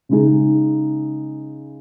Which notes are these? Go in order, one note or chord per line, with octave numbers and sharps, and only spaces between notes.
C#3 G#3 D#4 G#4